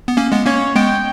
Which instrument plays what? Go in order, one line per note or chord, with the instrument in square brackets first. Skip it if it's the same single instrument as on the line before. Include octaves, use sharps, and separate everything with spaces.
[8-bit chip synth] B3
A#3 C#4
G#3 B3
[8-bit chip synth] A#3 C#4 [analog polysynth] C#5
[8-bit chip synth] G#3 B3 [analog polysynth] G5